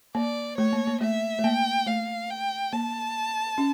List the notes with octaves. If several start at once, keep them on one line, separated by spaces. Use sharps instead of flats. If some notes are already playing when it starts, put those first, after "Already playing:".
A#3 D5
A3 C#5
A#3
A#3
A3 E5
A3
A#3 G5
A3 F5
G5
A#3 A5
C#4